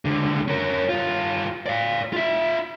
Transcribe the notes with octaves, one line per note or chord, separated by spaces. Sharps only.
C#2 D3
C#4 A#4
G2 F4
D5 F5
F4 E5